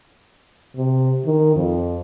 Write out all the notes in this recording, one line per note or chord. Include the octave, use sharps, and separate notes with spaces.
C3
D#3
F2